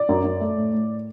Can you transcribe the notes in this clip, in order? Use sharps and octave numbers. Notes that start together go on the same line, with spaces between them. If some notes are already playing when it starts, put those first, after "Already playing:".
Already playing: D5
F#2
F#2
A3
A2
A2